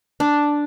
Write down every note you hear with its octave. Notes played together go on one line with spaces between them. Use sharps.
D4